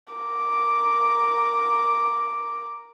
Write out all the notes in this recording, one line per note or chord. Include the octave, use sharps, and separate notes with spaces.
A#4 D6